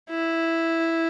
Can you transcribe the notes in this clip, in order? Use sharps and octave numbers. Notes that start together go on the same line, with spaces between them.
E4